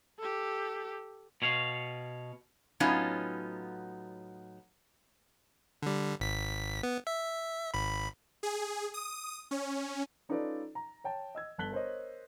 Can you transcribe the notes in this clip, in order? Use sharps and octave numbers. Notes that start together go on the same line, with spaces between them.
G4 A4
B2 C#5 F5
A2 F#3 B3 C#4 D#4 F4
D3 G3
G#1 B6
B3
E5
G#1 B5
G#4
D#6
C#4
C#4 D#4 F4 A4 B4 D5
A#5
C#5 G5 A5
D#5 E6 G#6
G1 A5 F#6 B6 F#7 G7
A#4 C5 C#5 D#5